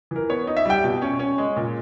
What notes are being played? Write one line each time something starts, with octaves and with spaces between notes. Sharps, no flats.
E3 A#4
B3 C#5
D#4
E5
G3 G5
B2
C#4
C#4
G#3
A#2